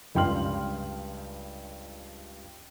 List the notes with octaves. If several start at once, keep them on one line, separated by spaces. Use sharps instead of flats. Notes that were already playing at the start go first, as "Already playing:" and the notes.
C#2 G2 G5 C6 F6 F#7